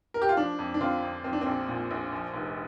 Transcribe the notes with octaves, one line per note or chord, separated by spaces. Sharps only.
A#4
G4
F4
F3 D4
F2
D4
D3 C4 F4
F2
F3 C4
D4
C4
A#1
A#2
A#1
F3
F1